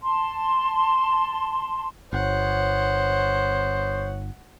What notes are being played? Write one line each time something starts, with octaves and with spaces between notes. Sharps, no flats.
A5 C6
G1 B3 C5 C#5 F#5